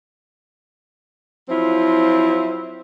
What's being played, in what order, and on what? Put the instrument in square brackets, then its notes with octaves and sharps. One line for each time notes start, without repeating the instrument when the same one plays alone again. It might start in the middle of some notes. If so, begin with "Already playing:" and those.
[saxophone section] F3 F#3 C4 E4 F4